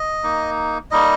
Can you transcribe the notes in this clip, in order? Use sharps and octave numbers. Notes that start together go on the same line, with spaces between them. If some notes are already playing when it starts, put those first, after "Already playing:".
Already playing: D#5
A#3 D#4
G3 A#3 D#4 D#5